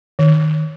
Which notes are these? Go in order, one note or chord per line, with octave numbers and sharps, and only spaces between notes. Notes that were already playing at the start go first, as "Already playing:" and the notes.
D#3